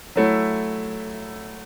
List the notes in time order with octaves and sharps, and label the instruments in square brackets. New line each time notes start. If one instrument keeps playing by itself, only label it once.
[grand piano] F#3 A3 E4